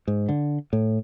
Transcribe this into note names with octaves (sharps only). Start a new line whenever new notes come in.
G#2
D3
A2